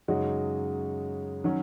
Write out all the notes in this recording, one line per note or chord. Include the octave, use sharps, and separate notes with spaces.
F#2 C#3 G#3 D#4 F#4
D#3 F#3 C#4